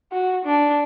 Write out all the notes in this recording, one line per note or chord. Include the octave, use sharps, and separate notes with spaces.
F#4
D4